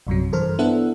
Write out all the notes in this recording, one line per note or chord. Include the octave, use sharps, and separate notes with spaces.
A#1 F#2 C3 F#3
G2 E3 A4 A#4 C5 F6
B3 D4 E4 A4 E5 F#5